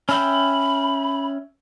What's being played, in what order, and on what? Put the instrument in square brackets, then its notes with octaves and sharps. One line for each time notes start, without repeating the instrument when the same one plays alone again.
[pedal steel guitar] C#4 E5 G5 [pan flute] B5